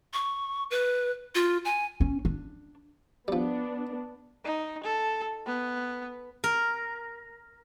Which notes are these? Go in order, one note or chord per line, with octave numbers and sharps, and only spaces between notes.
C#6
B4
F4
G#5
C#4
D4
F3 G3 B3 D4
D#4
A4
B3
A#4